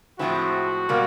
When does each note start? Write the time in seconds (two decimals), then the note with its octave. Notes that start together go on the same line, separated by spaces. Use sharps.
0.19 A2 F3 G#3 C4 E4 F#4
0.89 B2 G3 A#3